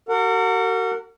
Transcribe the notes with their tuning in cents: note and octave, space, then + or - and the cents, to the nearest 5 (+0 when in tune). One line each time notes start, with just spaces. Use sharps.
F#4 +40 A#4 -40 F#5 -20